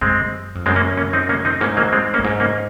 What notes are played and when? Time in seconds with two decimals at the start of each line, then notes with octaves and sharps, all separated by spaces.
0.01 F#2 G#3 C4
0.55 F2
0.66 F#2 G#3 C4
0.76 A#3 C#4
0.97 A#3 C#4
1.13 C4 D#4
1.29 A#3 C#4
1.45 C4 D#4
1.61 G#2 A#3 C#4
1.77 F#3 A#3
1.93 G#3 C4
2.14 A#3 C#4
2.18 F#2
2.24 G#2
2.40 A#3 C#4